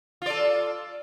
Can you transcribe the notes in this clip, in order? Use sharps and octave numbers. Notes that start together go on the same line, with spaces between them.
F4 A4 D5